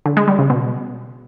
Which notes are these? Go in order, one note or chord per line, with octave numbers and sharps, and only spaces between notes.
D3
G#3
G3
C#3
B2